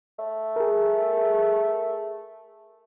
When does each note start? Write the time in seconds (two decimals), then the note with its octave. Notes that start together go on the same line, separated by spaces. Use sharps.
0.19 A3
0.56 G#4 A#4